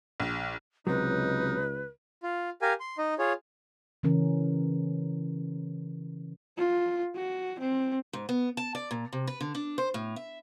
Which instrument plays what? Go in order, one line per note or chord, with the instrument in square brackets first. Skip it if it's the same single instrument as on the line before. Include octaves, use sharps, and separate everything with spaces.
[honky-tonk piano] A#1
[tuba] C#2 [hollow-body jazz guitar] C3 F#3 [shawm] D#4 [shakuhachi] B4
[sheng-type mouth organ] F4
G4 A#4 F5 G#5
C6
D#4 D#5
F4 G#4 C#5
[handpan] C#3 E3 C#4 A#4
[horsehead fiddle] F4
F#4
C4
[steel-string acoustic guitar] G#2
B3
A5
D5
A#2
C3
B4
D3
D4
C5
A2
E5